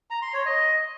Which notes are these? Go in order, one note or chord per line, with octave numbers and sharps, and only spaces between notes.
A#5
C6
C#5
D#5